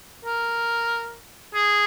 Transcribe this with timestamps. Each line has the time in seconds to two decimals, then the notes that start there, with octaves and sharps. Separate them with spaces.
0.25 A#4
1.54 G#4